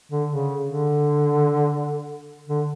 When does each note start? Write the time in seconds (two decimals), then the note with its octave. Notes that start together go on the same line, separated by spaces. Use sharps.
0.12 D3
0.30 C#3
0.67 D3
2.49 D3